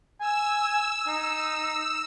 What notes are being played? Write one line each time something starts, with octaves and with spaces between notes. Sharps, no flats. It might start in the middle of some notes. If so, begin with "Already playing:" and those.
G#5 E6
D#4